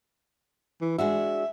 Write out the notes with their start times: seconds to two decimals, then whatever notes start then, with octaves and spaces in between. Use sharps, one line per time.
0.81 E3
0.98 G#3 D4 F#4 E5